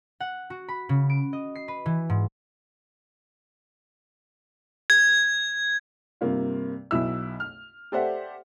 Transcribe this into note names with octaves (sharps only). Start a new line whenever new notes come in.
F#5
F#4
B5
C#3
D7
D#5
C7
B4
E3
G#2
G#6
G2 C3 A#3 F4
B1 B2 E4 E6
F6
G4 A4 C5 D5 E5 F#5